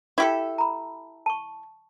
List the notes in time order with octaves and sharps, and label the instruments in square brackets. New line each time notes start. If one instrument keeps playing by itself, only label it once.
[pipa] E4 G4 A4
[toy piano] A#5 B5
A5 C#6